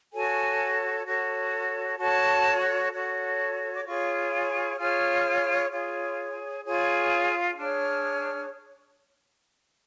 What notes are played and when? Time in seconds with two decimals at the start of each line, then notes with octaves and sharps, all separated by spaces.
0.12 F#4 A4 C#5 G#5
1.06 F#4 A4 C#5
1.98 F#4 A4 C#5 A5
2.92 F#4 A4 C#5
3.74 D6
3.85 F4 G#4 C#5 C#6
4.78 F4 G#4 C#5 F6
5.71 F4 G#4 C#5
6.64 F4 G#4 C#5
7.57 D4 G#4 C#5 F6